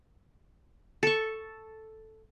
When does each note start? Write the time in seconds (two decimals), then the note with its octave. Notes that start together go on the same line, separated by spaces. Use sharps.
1.03 A4 C#6